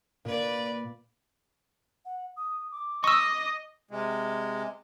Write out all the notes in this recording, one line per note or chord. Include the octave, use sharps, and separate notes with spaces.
A#2 B4 D5
F#5
D#6
D6
D#5 C#6 E6
C3 G#3